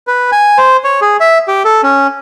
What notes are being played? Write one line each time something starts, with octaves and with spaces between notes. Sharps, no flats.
B4
G#5
C5
C#5
G#4
E5
G4
A4
C#4